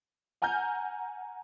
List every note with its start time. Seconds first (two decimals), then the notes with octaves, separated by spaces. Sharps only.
0.42 F#5 G#5 A#5 F6 G6